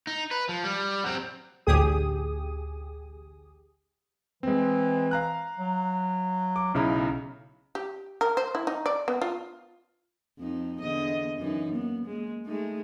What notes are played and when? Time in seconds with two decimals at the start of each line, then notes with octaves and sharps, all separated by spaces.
0.07 D#4
0.31 B4
0.49 F3
0.64 G3
1.04 F#3 C4
1.67 A1 D2 G4 G#4 D#6
4.43 E3 G#3 C4
5.11 F5 A#5 F#6
5.57 F#3
6.56 D6
6.74 B1 C#3 D#4 E4
7.75 G4
8.21 A#4
8.37 C5
8.55 E4
8.67 D#4
8.86 D5
9.08 B3
9.22 F4
10.39 F2 D#4
10.80 E2 D3 D#5
11.37 F#2 E3 D#4
11.72 A#3 B3
12.06 G#3 A#3
12.45 G#3 A3 D#4